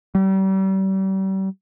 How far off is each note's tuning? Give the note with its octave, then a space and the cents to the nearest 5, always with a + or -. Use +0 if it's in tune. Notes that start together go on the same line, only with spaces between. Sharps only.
G3 -35